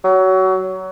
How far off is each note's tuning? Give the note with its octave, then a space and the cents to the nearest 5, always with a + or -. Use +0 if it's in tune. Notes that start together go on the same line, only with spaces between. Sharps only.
F#3 +25